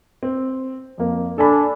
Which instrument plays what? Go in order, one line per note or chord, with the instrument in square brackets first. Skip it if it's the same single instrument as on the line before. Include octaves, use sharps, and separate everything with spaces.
[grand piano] C4
F2 A#3
[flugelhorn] D4 [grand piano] A4 G#5 B5